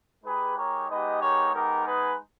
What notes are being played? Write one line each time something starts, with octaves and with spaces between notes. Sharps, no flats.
G#3 D#4 G4 G#4 B4
A#4 C#5
G#3 B3 D#4 G4 B4 D#5
A#4 C#5
G#3 B3 D#4 G4 A#4
G#4 B4